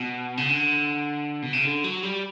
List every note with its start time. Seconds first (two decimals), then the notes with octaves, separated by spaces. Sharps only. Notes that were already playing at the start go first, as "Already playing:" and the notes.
Already playing: B2
0.37 C#3
0.49 D3
1.42 B2
1.53 C#3
1.65 D3
1.84 F#3
2.03 G3